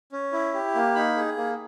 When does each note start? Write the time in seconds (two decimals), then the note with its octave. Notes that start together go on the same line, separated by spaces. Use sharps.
0.12 C#4
0.32 E4
0.54 G4
0.75 A#3
0.95 D#4 B5
1.17 G#4
1.37 A#3